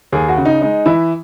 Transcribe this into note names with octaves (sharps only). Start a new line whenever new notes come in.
D#2 G#4
F#4
C#3
D#4
G#3 D#4
E3 E4